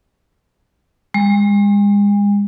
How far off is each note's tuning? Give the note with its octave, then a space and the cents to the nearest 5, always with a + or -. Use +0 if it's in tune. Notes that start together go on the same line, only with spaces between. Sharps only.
G#3 -40